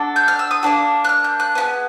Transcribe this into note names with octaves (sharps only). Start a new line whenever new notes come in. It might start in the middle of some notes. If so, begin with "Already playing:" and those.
Already playing: D4 F#4 A4
G6
F6
E6
D#6
A#3 D4 F#4
F#6
F6
G6
F#6
B3 E4 G#4